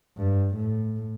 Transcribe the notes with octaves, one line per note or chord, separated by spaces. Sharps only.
G2
A2